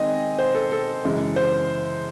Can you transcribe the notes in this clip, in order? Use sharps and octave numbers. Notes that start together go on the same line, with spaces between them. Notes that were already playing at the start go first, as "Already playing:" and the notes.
Already playing: D#3 G#3 C4 D#5 G#5
C5
A4
A4
F#2 C#3 E3 G#3
C5